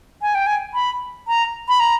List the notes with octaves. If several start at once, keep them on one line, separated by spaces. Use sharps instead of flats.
G#5
G5
G#5
B5
A#5
B5
A#5